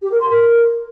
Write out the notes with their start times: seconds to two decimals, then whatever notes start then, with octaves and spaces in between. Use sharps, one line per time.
0.02 G4
0.11 A#4
0.20 C6
0.29 A#4